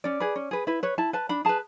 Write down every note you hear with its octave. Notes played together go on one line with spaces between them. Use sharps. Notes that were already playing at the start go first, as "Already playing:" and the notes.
C#4 D5
G#4 B4
C#4
G#4 B4
E4 B4
B4 C#5
E4 A5
B4 A5
D4 B5
G#4 B4 A5